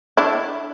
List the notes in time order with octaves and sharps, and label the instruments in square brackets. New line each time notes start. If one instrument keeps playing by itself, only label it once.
[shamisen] D4 E4